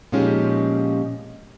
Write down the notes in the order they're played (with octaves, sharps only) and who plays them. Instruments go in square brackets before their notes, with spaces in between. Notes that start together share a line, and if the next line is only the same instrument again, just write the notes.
[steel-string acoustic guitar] A#2 F3 G#3 C#4 D#4 G4